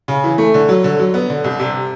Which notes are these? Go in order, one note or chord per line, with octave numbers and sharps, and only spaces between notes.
C#3
E3
A3
D3
F#3
D3
F#3
B3
D3
C2
C3